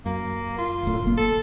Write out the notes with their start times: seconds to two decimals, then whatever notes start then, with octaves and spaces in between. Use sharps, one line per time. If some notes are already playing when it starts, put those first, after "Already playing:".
0.06 F#2 A#3
0.58 F4
0.83 D1 D2 A2
1.03 F#1 A#3
1.17 A4